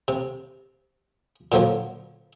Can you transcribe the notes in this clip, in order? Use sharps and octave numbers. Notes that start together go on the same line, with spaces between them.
C3
A#2 D3 F3 F#3